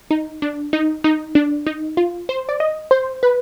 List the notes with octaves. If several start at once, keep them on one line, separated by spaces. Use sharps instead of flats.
D#4
D4
D#4
D#4
D4
D#4
F4
C5
D5
D#5
C5
B4